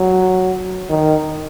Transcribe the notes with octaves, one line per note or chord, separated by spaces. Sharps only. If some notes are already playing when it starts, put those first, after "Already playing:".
Already playing: F#3
D#3